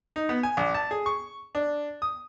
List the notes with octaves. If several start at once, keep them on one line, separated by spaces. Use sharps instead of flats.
D#4
B3
G#5
A#1
A5
G#4
C#6
D4
D#6